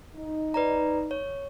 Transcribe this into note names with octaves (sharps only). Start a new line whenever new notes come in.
D#4
B4 D5 A#5
C#5